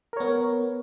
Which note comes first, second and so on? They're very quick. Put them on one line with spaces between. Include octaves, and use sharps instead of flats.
A#4 C#5 B3